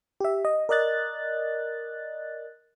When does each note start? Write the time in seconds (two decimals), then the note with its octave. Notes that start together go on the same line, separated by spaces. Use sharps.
0.20 G4 E5
0.45 D#5
0.69 A#4 D5 D#5 F#6 A6